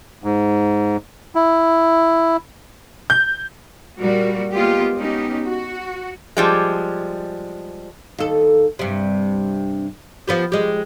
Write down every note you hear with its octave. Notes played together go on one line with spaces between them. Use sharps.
G#2
E4
G6
A#2 G3 F#4 A#4
G#3 A#3 B3 F4 G4
B3 C#4 D#4 G4
F#4
F3 G3 G#3
D#2 A4
G2 C3
F3 B3 G4
G#3 G4